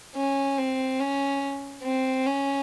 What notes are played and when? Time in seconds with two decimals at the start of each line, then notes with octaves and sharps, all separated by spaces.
0.15 C#4
0.58 C4
0.99 C#4
1.83 C4
2.26 C#4